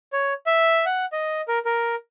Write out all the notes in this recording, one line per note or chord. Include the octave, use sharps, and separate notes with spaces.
C#5
E5
F#5
D#5
A#4
A#4